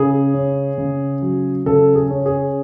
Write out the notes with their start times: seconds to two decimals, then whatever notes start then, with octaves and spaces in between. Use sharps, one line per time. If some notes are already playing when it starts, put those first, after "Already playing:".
Already playing: C#3 G#4
0.34 C#4
0.78 C#3
1.22 F#3
1.66 C#3 A4
1.95 G#4
2.10 C#4
2.26 G#4